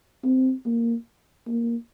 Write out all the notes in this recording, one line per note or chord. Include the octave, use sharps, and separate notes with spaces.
C4
A#3
A#3